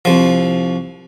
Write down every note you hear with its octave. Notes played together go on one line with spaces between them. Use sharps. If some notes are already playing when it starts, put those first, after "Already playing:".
C2 F3